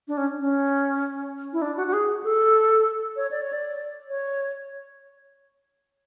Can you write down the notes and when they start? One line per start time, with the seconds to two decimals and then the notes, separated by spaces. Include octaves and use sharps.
0.08 D4
0.17 C#4
0.39 C#4
1.53 E4
1.62 D4
1.77 F#4
1.87 F#4
1.93 G#4
2.24 A4
3.16 C#5
3.31 D5
3.41 C#5
3.53 D5
4.08 C#5